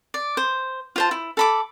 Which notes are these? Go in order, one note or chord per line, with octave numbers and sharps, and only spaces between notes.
D5
C5
F4 C5 A5
E4
A4 B5 D6